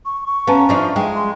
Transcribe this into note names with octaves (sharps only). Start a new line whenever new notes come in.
C#6
C#6
B3 C#4 F5 A5 A#5
F3 D4 D#4
G#3 G5
C6